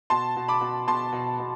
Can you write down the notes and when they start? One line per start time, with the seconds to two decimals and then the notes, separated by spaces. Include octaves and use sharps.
0.10 B2 A5 C6
0.36 B2
0.48 B5 D6
0.61 B2
0.87 B2 A5 C6
1.12 B2
1.39 B2